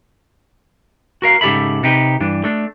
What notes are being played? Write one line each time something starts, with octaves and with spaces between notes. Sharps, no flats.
F#4 A#4 F5
G#2 C#3 G4 A4 E5 B5
C3 D#4 G4 B4
G2 E3 D4
A3 D4